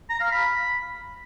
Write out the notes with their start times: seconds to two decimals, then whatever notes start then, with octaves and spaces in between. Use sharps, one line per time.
0.09 A#5
0.20 F5
0.31 B5